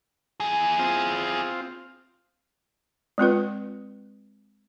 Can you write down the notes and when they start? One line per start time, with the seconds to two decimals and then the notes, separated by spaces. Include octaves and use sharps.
0.40 E4 G#4
0.79 C4 F4
3.18 G#3 C4 F4 B4